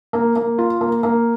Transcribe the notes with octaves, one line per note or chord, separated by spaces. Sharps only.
A#3
A#3
F4
A#3
A#3